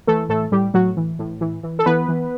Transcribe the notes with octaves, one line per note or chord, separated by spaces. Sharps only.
E3 A3 A4
A2 A3 A4
A2 G3 G4
A2 F#3 F#4
E3
A2
E3
E3
A4
E3 B3 B4
E3